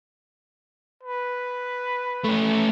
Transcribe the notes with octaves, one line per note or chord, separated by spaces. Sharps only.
B4
A3 C#4